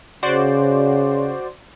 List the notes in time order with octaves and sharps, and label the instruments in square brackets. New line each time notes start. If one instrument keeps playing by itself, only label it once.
[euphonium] C#3 [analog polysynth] F#4 C5 D5